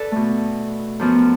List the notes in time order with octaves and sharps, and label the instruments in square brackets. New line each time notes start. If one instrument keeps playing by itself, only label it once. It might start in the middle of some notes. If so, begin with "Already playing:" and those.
Already playing: [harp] A4 B4 D5
B2 A3
F#2 F3 B3